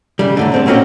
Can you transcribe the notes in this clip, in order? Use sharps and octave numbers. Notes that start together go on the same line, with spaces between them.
C#3 G3
F#2 A2 D3
G#3 C4 D4
B2 A3 A#3 C#4 F#4 G4